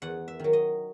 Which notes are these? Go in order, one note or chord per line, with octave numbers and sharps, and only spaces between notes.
E2 F#5
E5
D#3 F#3
D#5